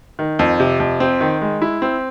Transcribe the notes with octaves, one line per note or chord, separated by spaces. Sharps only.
D#3
F2
C3
F2
C4
D#3
G#3
E4
C4